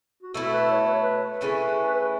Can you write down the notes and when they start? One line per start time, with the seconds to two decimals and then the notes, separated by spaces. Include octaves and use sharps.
0.23 F#4
0.34 B2 A3 E4 A4
0.44 A4
0.52 B4
0.70 C#5
0.87 B4
0.94 C#5
1.03 B4
1.41 C#3 A3 C#4 E4
1.95 B4